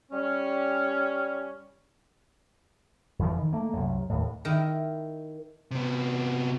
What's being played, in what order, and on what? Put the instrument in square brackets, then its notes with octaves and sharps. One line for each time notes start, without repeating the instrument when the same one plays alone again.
[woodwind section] G3 C#4
[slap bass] F2 E3 F3
D#3
A3 A#3
C2 F#2
D#2 A2
[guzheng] D#3 E4
[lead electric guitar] C3 B3